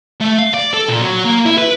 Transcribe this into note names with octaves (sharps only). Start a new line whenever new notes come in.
A3
F5
D5
A4
A#2
F#3
A#3
E4
B4